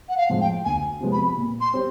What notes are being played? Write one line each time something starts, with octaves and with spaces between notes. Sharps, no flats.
F#5
F5
A2 F3 G#3
G5
D2 G#5
C3 F3 G#3 B3
B5
A#2
C6
G3 C4